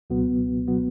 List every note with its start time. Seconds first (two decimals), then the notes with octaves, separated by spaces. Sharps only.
0.10 C#2 B2 F#3 B3 F#4
0.67 B2 F#3 B3 F#4